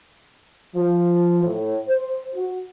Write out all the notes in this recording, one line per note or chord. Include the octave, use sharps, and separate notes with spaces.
F3
A2
C5
F#4